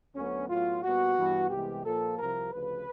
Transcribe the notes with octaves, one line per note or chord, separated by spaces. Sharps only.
D2 D3 F#3 B3 C#4
A2 F#3 B3 F4
A#2 G3 B3 F#4
G2 E3 G3 B3
C2 C3 E3 G#3 B3 G4
A#2 F3 A#3 A4
C2 C3 F3 A#4
D2 C#3 F3 B4